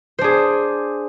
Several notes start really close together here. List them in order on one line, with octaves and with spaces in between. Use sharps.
C5 D4 G#4